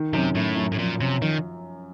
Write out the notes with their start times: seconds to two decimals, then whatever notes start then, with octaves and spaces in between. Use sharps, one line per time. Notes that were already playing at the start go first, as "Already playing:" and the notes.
Already playing: D#3
0.13 F#2 C3
0.35 F#2 A2
0.57 F#2
0.72 A2
0.79 A#2 F3
1.00 C3 C#4
1.22 D#3 F3